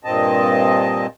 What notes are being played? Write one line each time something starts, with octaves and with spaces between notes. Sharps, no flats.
G2 A#2 C4 D#5 A5